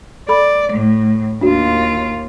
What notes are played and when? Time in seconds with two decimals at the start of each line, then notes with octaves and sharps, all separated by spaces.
0.29 A4 D5 B5
0.72 A2
1.41 D#2 D4 F4 F#4